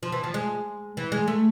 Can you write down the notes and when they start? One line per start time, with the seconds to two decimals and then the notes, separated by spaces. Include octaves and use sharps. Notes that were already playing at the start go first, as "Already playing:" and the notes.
0.03 F3
0.12 E3
0.24 F3
0.34 G#3
0.97 E3
1.12 G#3
1.28 A3